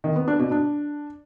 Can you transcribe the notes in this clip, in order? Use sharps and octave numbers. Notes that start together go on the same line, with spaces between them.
D#3
B3
D4
B2
D4